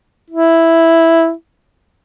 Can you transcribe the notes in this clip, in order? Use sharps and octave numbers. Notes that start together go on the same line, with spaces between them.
E4